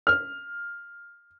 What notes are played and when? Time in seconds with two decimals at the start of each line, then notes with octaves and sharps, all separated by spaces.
0.07 F6